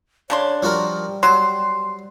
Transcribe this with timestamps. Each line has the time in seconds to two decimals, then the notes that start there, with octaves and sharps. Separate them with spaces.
0.30 C#3 D4 C#5 C6
0.63 F3 G3 F#4 A#4
1.23 F#3 C5 C6